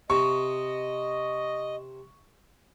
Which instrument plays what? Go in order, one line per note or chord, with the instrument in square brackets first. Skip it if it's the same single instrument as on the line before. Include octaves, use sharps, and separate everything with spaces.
[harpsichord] C3 [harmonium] D#5 [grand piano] C#6